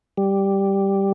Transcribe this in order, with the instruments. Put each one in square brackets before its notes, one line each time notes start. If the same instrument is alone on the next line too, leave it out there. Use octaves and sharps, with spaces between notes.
[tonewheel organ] G3